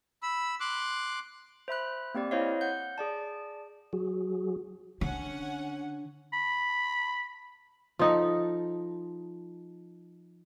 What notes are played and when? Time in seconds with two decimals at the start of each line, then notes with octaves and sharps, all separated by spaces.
0.23 B5 E6
0.60 C6 D6 F#6
1.68 C5 E5 B5 F#6
2.15 A#3 C4 G4 D5
2.31 E4 C5 C#5 D#5 F5
2.61 F#5 G6
2.98 G#4 D5 A5
3.93 F#3 F#4 G#4
5.01 D3 C#4 F#5
6.33 B5
7.99 F3 D#4 A4